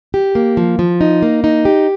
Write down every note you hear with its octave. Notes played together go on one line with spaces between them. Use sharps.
G4
A#3
F3
F3
D#4
A#3
D#4
G4